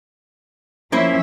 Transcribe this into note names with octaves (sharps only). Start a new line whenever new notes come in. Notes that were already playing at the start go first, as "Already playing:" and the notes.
F3 A#3 C#4 E4 C5 E5